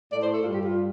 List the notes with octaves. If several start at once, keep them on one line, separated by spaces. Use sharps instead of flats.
A2 A3 D5
C5
A4
G2 G3 F4
G4
F4